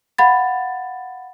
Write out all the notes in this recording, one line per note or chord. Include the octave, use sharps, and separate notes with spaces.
F5 F#5 B5 G#6 A6